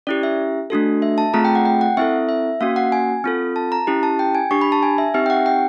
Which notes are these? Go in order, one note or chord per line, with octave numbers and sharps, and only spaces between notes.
C#4 E4 G4 D5
E5
A3 D4 F#4 A4
E5
A5
A3 C4 F4 G#4 A#5
G5
F#5
G5
F#5
C4 E4 A4 E5
E5
A#3 C#4 F#4 F5
F#5
G#5
C4 F4 A4
A5
A#5
C#4 E4 G4
A5
G5
G#5
D4 G4 C#6
B5
A5
G#5
E5
C4 D#4 G4 E5
G5
F#5
G5